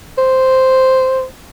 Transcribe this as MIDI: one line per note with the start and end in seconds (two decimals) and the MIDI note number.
0.18 1.24 72